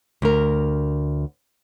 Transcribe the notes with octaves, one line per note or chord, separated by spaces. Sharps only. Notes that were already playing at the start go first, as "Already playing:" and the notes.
D2 A#4